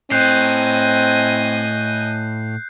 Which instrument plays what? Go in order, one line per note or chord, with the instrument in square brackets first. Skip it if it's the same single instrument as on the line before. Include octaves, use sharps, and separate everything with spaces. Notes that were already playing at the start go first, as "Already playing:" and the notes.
[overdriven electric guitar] A2 [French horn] C4 [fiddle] D#5 G#5 [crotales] F#6 G6 C7